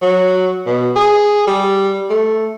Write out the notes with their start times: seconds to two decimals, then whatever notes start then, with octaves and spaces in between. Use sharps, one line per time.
0.02 F#3
0.66 B2
0.96 G#4
1.47 G3
2.10 A3